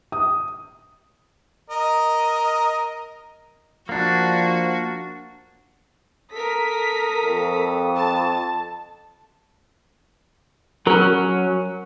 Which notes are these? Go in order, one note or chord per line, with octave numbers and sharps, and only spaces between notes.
D#6
A#4 D#5
F3 A#3 D4 F#4
A4 A#4 D#6 B6
F2
A5
F#3 C#4 A#4